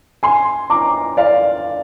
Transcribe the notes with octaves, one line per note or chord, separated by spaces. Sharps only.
G#5 C6
A#5 D6
D5 F5